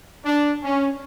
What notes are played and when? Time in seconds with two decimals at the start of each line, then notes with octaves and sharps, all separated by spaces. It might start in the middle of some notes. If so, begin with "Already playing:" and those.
0.25 D4
0.63 C#4